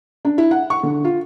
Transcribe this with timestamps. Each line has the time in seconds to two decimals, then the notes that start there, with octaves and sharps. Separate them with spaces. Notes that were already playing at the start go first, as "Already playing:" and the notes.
0.25 D4
0.38 E4
0.51 F#5
0.70 C#6
0.83 D3
1.05 F4